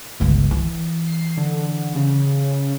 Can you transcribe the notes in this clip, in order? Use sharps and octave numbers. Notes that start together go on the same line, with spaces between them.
G1 C#2
E3
C7
D3
C#3